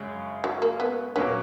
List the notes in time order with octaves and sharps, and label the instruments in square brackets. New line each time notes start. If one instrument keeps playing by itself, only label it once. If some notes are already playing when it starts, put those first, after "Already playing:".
Already playing: [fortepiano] F#2 C#3 G#3 C#4 G#4
[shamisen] F#3
A#3
B3
[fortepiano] A#2 F#3 A#3 C#4 [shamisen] B3